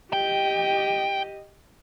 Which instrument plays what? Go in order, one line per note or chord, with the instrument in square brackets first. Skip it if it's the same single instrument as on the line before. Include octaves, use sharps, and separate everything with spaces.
[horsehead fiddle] G4 D#5 [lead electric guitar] G5